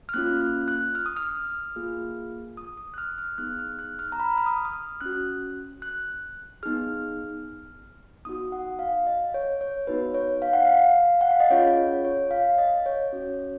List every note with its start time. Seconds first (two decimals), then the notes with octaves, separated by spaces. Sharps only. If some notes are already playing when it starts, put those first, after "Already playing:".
0.09 F6
0.14 A#3 C#4 F4 F#6
0.41 F#6
0.68 F#6
0.95 F6
1.06 D#6
1.16 F6
1.76 A#3 F4 G#4
2.57 D#6
2.77 D#6
2.94 F#6
2.98 F6
3.18 F6
3.38 B3 D#4 G#4 F#6
3.59 F6
3.79 F#6
3.99 F6
4.12 A#5
4.20 B5
4.38 F6
4.46 D#6
4.65 D#6
4.73 F6
5.01 C#4 F#4 F#6
5.82 F#6
6.63 B3 D#4 G#4 F6
8.25 B3 D#4 F#4 D#6
8.52 F#5
8.79 F5
9.07 D#5
9.34 C#5
9.61 C#5
9.87 B3 D#4 F#4 B4
10.14 C#5
10.42 F5
10.53 F#5
10.65 F5
11.21 F#5
11.31 F5
11.40 D#5
11.50 C#4 F4 G#4 C#5
11.77 C#5
12.05 C#5
12.31 F5
12.58 D#5
12.86 C#5
13.12 C#4 F#4